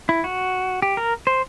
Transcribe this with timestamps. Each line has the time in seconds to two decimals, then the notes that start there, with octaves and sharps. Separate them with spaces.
0.09 E4
0.24 F#4
0.82 G4
0.97 A#4
1.27 C5